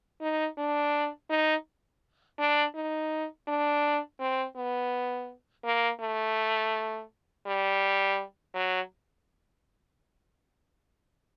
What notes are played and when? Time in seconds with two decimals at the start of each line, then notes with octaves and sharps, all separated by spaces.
0.21 D#4
0.58 D4
1.30 D#4
2.39 D4
2.75 D#4
3.48 D4
4.20 C4
4.56 B3
5.65 A#3
6.01 A3
7.46 G3
8.55 F#3